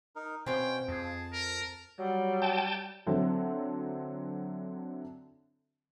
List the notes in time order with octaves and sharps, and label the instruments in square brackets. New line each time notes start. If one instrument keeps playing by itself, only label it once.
[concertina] D#4 A#4
[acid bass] B2 [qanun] C4 F5 [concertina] C#4 C5 G#5 [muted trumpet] G5
[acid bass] F2 [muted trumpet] G#4 [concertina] A5
[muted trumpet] A#4
[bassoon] F#3 [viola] G3
[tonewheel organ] G5 A5
[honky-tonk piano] D3 F#3 C4 E4 A4